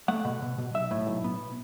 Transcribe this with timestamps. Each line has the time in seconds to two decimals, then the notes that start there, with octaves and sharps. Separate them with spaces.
0.08 A3 F#5
0.25 B2
0.42 B2
0.58 B2
0.74 B1 E5
0.91 A2
1.07 B1
1.24 B3